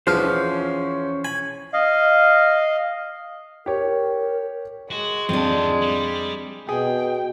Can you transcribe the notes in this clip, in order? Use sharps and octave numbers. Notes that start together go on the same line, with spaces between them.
E2 F3 C#4 B4 C5 F6
G#5 B5
D#5 F5
G4 A#4 C#5
G#3 F#4
F2 D#3 C4 D4 F4
G3
B2 G#4 G5